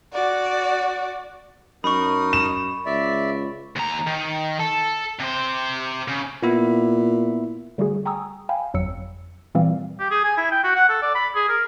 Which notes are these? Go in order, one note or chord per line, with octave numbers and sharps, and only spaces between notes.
F#4 D5
F#2 D#4 A#4 B5 C#6 D#6
E7
C#2 D5 E5
D#2 A#5
D#3
A4
C3 C5
C#3
A#2 B3 E4 E5
D3 G3 A3 F#4 G#4
G5 G#5 A#5 C#6 D#6 E6
F5 G5 G#5 B5
G1 F2 F#3 E6 C#7
A#2 E3 G3 C4 D5 F5
G4
G#4
G#5
E4
G5
F#4
F#5
A4
D5
B5
G#4
A#4